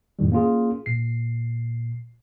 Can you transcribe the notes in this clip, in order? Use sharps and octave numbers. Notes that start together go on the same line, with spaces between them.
F2 A2 D#3 G3
A#3 C#4 F4 G#4
A#2 C7